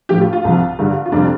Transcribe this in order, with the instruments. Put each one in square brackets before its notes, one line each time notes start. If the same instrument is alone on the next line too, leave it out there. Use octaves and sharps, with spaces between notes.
[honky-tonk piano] A2 F3 A3 G4
F4
F4
C2 C3 F3
G2 D3 G3
F4
F2 C3 G3 D4